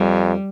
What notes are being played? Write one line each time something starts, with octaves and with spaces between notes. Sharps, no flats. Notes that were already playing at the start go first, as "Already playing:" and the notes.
Already playing: F2 G3